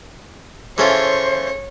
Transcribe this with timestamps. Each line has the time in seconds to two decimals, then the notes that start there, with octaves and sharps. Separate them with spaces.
0.78 E3 C#4 F4 G#4 A4 C5 C#5 E5